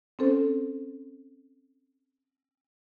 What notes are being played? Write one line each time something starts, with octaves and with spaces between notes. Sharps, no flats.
C4 C#4 A4 C5